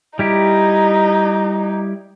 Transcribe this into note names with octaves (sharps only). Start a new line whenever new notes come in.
G3 D#4 E4 G4